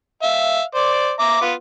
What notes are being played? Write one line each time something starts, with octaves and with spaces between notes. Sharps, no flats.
E5 F5
C5 D5
E5 A#5 D6
B3 F4